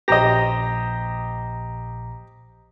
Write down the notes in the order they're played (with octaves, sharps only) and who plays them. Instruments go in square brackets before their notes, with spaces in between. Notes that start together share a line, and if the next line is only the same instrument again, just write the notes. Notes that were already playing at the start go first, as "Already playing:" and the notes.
[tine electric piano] A#1 A#5 A#6 [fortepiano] G4 C5 D#5